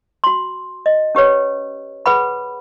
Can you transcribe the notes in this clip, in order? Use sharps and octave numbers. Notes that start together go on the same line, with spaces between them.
F#4 C6
D#5
C#4 G4 B4 C#5
G#4 B4 F#5 B5